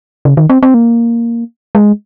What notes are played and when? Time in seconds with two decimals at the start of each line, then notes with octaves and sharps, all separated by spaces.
0.25 C#3
0.37 D#3
0.50 C4
0.63 C4
0.74 A#3
1.75 G#3